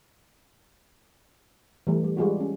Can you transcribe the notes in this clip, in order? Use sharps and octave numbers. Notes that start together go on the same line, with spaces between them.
E3 G3 A3
G3
G3 G#3 F4 F#4
C#4